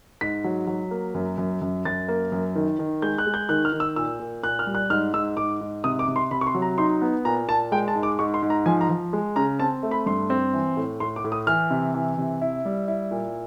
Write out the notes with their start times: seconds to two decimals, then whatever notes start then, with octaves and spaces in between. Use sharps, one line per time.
0.21 G#2 B6
0.44 F#3
0.67 F#3
0.91 A#3
1.15 F#2
1.38 F#2
1.61 F#2
1.85 F#2 A6
2.08 A#3
2.32 F#2
2.55 D#3
2.79 D#3
3.02 G#3 G6
3.18 F#6
3.27 G#3
3.34 G6
3.49 D#3 F#6
3.65 F6
3.72 D#3
3.80 E6
3.96 A#2 E6
4.20 A#2
4.43 A#2 F#6
4.59 F6
4.67 G3
4.75 F#6
4.90 G#2 F6
5.14 G#2 E6
5.37 G#2 D6
5.61 G#2
5.84 C3 D#6
5.99 D6
6.08 C3
6.16 C6
6.31 C3 B5
6.41 C#6
6.47 C6
6.54 F#3
6.62 A#5
6.78 D#4 C6
7.02 B3
7.25 A#2 A#5
7.48 A#2 A5
7.72 G#3 G5
7.88 A5
7.95 G#2
8.03 D6
8.19 G#2 C#6
8.34 C6
8.42 G#2
8.50 A#5
8.66 F3 G#5
8.81 A#5
8.90 F3
9.13 G#3
9.36 C#3 A#5
9.60 C4 A5
9.83 A3
9.91 B5
10.06 G2 C6
10.30 C4
10.53 E3
10.77 A2
11.00 A2 C6
11.16 D6
11.24 A2
11.32 D#6
11.47 E3 F6
11.71 C3
11.94 E3
12.18 C3
12.41 E4
12.65 G3
12.88 E4
13.11 A#2